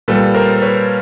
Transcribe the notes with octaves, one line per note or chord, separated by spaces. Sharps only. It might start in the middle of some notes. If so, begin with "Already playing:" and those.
A#2 G3 A4 B4
A#4 C5
B4 C#5